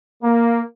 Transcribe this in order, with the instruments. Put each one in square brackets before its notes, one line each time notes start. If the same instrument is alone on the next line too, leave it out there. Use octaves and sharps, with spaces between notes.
[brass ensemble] A#3